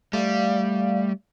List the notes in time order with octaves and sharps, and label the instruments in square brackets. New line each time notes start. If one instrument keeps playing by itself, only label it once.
[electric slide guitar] G3 [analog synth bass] A3 [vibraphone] D5 F5